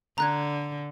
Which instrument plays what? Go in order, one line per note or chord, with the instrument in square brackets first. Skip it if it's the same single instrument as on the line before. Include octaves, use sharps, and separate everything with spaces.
[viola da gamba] D3 [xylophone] A#5 F#6 G#6